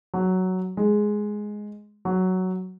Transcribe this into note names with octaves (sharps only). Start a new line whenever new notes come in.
F#3
G#3
F#3